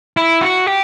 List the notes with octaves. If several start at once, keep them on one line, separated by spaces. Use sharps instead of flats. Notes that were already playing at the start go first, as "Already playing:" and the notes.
E4
F#4
G4